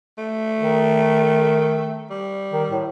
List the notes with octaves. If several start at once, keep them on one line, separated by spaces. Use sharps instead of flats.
A3
D#3
G3
D#3
A2